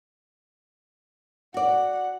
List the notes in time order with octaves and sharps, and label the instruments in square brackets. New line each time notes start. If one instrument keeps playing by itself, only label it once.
[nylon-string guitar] F#4 D5 [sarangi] F#5